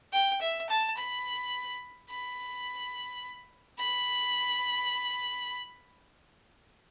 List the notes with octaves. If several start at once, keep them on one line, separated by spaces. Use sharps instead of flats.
G5
E5
A5
B5
B5
B5